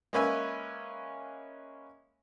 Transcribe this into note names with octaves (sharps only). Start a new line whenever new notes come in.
G#3 A#3 C#4 B4 E5 G#5